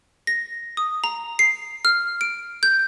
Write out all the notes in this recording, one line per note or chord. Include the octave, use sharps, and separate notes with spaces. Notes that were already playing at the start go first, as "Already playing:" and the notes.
A#6
D#6
A#5
C7
F6
D7
G6